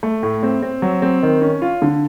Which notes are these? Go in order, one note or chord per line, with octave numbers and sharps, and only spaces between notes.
A3
A2
C4
C4
F#3
C4
D#3
C#4
F4
D3